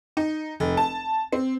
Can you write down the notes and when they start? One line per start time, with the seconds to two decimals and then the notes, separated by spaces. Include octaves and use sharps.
0.17 D#4
0.60 F1
0.77 A5
1.33 C4